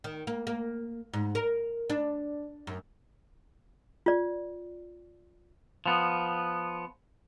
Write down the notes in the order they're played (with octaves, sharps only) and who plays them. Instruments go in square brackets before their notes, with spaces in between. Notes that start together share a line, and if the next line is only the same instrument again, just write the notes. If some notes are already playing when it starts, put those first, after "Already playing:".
[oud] D#3
A#3
A#3
G#2
A#4
D4
F#2
[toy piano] F4 D5
[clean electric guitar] F3 B3